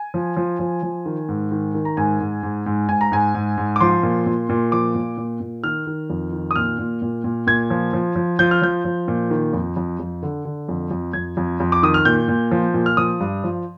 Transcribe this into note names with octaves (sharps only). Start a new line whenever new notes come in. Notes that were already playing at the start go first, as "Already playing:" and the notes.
Already playing: G#5
F3
F3
F3
F3
D#3
G#2
D#3
D#3
A#5
G#2 G#5
G#2
G#2
G#2
G#2 G#5
A#5
G#2 G#5
G#2
G#2
D6
F3 C6
A#2
A#2
A#2
F3 D6
A#2
A#2
A#2
D#3 F6
D#3
F2
D#3
D#6
A#2 F6
A#2
A#2
A#2
A#2 G#6
F3
F3
F3
F3 G6
F6
F3 G6
F3
A#2
D#3
F2
F2
F2
D3
D3
F2
F2
F2 G#6
F2
F2
D6
D#3 D#6
F6
A#2 G6
A#2
F3
A#2
F6
F3 D#6
G2
F3